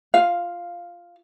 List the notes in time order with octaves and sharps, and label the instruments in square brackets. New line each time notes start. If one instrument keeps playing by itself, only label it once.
[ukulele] F4 F5